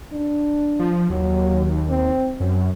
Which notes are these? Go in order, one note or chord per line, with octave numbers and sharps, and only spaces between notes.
D4
F3
D#2 F#3
C4
F#2 F#3